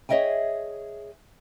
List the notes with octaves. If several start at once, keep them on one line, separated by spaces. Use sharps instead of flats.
G#4 C#5 D#5 E5 G5 G#5